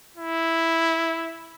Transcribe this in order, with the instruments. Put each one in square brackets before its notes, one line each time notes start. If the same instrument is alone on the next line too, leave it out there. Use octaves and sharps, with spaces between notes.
[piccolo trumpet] E4